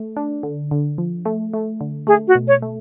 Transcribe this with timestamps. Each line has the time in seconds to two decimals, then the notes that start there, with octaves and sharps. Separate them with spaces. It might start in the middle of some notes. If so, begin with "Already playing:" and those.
Already playing: A3
0.17 D4
0.43 D3
0.71 D3
0.98 F3
1.25 A3
1.54 A3
1.81 D3
2.07 A3 G#4
2.28 F#4
2.35 B2
2.48 C#5
2.62 A3